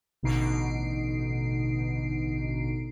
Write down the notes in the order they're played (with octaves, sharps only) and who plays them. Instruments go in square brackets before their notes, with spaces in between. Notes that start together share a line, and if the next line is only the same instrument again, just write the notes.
[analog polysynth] A1 B2 D3 D#4 C7 D7